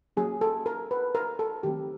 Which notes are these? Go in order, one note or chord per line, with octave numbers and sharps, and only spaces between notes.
F#3 A#3 C#4 G#4
A4
A#4
B4
A#4
A4
D#3 F#3 A3 C4 G4